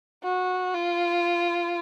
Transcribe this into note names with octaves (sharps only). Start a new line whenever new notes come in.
F#4
F4